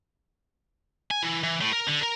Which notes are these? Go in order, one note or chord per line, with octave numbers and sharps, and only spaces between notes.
G#5
E3
E3
A2
A#4
D3
A#4